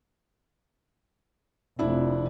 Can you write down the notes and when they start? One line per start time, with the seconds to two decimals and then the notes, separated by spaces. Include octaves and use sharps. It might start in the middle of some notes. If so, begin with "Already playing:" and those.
1.79 F1 D4 E4 D5